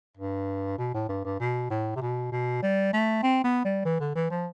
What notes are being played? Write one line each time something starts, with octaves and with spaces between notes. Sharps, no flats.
G2
B2
A2
G2
G2
B2
A2
C3
B2
B2
G3
A3
C4
B3
G3
E3
D3
E3
F3